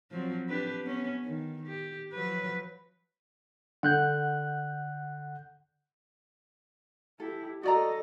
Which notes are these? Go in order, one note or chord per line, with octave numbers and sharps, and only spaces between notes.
F3 F#3 C4
D4 G4 B4
B3 C#4
D#3
G4
F3 F#3 B4
D3 F#5 F#6 G6
E4 G4 A4
F#4 A4 D5 D#5 A#5